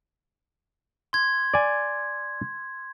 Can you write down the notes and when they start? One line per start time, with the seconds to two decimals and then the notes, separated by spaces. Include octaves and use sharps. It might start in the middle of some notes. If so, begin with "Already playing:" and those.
1.13 C6 G#6
1.54 D5 G#5